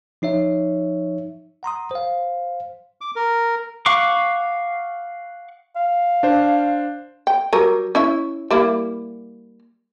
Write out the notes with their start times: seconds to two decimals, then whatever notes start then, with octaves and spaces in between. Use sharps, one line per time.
0.22 F3 D#4 C#5 E5
1.63 F#5 A#5 C6 D#6
1.91 C5 F5
3.01 D6
3.16 A#4
3.86 F5 F#5 C#6 D6
5.76 F5
6.23 D4 C5
7.27 G5
7.53 F#3 G3 A#4
7.95 C#4 E4 E5
8.51 G3 A#3 E4